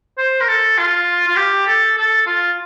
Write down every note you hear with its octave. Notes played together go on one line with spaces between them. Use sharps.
C5
A#4
A4
F4
F4
G4
A4
A4
F4